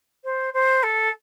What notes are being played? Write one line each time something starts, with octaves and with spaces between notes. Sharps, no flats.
C5
C5
A4